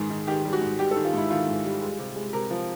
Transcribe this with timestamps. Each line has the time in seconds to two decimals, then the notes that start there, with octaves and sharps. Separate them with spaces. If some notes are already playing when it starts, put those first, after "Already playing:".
Already playing: G#2 D#3 G#4
0.10 D#3
0.27 D#3 G4
0.45 G3
0.53 F#4
0.61 G#2
0.79 G3 G4
0.91 A4
0.96 D#3
1.05 F4
1.13 G#2 E4
1.30 D#3 F4
1.47 G#2
1.65 G3
1.81 G#3
1.99 C3
2.16 G#3
2.33 C3 A#4
2.51 F3